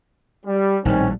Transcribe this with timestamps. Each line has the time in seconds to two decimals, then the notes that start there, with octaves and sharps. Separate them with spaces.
0.46 G3
0.85 A#1 A2 D#3 G3 C4 C#4